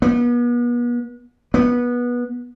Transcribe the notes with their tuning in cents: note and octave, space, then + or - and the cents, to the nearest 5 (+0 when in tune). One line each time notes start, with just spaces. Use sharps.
B3 -40
B3 -20